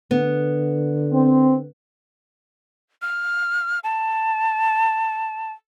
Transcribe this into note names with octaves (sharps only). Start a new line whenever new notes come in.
D3 B3
C4
F6
A5